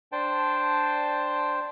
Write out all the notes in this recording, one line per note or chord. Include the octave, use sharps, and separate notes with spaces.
D4 C5 G5 A5